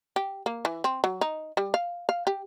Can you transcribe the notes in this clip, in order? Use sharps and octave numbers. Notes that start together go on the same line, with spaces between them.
G4
A#3
E3
C4
F#3
D#4
G3
F5
F5
G4